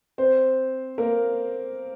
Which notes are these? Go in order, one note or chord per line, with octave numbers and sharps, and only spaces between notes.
C4 C5
A#3 A#4